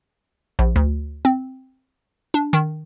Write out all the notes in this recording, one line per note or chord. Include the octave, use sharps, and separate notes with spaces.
A#1
D2
C4
D4
D#3